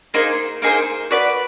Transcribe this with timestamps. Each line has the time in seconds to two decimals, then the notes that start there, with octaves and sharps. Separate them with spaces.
0.14 A#3 D#4 G#4 C5
0.62 A#3 D#4 G#4 C5
1.11 F#4 B4 D5